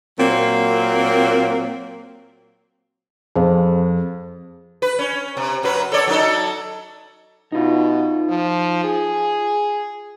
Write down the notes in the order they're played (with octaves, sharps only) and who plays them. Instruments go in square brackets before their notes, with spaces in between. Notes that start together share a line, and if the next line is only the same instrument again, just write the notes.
[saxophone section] A#2 F#3 A#3 C4
[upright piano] F2 [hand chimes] G#4 C5 F5
[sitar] B4
C#4
C3
F#2 F#3 B4
A4 C#5 D5
F#3 D#4 A4
[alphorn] B2 [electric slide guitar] D#4 F4
[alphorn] F3
G#4